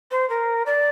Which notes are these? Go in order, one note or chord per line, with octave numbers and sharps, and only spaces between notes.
C5
A#4
D5